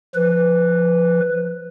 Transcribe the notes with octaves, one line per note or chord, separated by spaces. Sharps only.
F3 B4